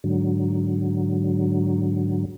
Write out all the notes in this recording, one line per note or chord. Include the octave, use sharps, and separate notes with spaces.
G#2 D3 F#3